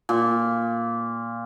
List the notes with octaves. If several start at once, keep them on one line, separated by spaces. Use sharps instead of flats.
A#2